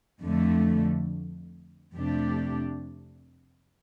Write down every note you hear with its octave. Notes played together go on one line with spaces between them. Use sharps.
F2 D3 A3
F2 C3 A3 D4 G4